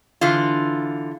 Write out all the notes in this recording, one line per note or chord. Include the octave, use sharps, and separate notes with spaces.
D3 E3 F4